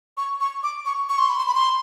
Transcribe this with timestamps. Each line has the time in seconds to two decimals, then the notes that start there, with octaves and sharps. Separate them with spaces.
0.17 C#6
0.40 C#6
0.63 D6
0.86 C#6
1.09 C#6
1.18 C6
1.29 B5
1.38 C6
1.48 B5
1.55 C6